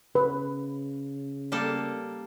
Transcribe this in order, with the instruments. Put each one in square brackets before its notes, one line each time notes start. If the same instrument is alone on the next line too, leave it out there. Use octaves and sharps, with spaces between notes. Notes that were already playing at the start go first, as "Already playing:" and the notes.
[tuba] C#3 [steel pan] B4
[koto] G3 A#3 A4